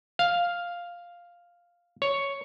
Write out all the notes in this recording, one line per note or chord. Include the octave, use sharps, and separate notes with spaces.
F5
C#5